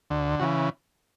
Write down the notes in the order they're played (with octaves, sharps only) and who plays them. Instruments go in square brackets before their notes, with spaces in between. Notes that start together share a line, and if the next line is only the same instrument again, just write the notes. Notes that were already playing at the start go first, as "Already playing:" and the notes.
[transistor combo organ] D2 D3
C#3 E3 F#4